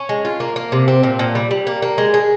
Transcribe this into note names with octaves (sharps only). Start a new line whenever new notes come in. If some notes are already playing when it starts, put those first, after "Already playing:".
Already playing: C#4
G#3
F4
A#3
A#3
C3
C4
A#2
A#2
G3
G3
A#3
A#3
G#3
G#4